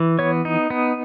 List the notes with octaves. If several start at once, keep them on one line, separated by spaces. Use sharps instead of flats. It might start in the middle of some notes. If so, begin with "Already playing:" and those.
Already playing: E3
B3 C#5
D#4
B3